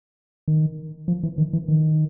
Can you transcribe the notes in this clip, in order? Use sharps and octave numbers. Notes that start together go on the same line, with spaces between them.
D#3
F3
E3
D#3
E3
D#3